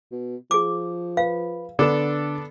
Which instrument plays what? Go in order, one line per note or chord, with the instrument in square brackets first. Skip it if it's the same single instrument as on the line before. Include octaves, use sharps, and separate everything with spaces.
[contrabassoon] B2
[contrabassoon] F3 [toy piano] G#4 D6
[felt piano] B4 [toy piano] F5
[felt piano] D3 E7 [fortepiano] B3 D4 A4